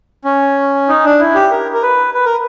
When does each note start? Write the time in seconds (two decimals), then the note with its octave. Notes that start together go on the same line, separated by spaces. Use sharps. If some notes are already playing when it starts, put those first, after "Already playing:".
0.25 C#4
0.89 D#4
1.04 D4
1.19 E4
1.35 G4
1.51 A#4
1.74 A#4
1.82 B4
2.14 B4
2.25 A#4